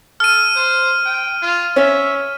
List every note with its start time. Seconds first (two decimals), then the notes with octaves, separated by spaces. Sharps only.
0.20 A4 F6 D#7
0.55 C5
1.05 G5
1.42 F4
1.76 C#4 E5